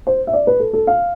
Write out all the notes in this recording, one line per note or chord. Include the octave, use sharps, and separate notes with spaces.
C5
E5
D5
B4
A4
A4
F5